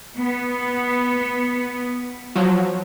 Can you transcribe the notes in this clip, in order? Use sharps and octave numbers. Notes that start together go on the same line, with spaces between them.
B3
F3 F#3